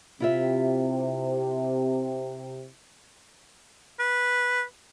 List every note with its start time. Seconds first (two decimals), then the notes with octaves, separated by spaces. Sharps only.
0.20 C3 E4 F4 E5
4.00 B4